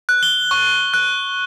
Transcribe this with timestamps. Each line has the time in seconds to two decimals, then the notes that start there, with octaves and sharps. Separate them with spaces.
0.09 F#6
0.23 G7
0.51 C#6
0.94 F#6